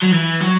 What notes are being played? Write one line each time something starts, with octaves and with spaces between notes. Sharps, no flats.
F#3
E3
F#3